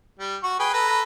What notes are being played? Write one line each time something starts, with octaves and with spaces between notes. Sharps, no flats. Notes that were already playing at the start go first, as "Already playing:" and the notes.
G3
F#4 C#6
G#4 B4 G5
A4 B4 A#5